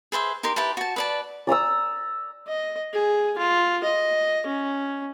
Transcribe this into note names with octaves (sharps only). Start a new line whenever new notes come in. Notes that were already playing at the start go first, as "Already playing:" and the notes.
G#4 B4 C5 E5
D#4 G4 A#4 C6
E4 G4 B4 A5
F#4 A5
B4 D5 A5
D5 A#5 D#6 E6
D#5
G#4
F4
D#5
C#4